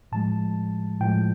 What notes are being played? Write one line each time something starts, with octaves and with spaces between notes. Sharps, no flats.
A2 F3 G#3 A5
A2 F3 G#3 G5